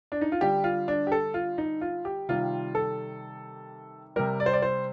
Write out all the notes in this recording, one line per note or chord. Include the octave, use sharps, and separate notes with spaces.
D4
D#4
F4
D3 G3 G4
F4
D4
G4
A4
F4
D#4
F4
G4
C3 D#3 G3 F4
A4
C3 G3 A#4
D5
C5
D5
C5